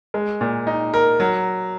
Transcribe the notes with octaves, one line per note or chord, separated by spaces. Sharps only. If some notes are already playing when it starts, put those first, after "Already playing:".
G#3
A#2
D#4
A#4
F#3